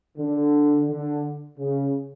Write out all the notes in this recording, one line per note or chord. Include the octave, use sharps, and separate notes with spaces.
D3
D3
C#3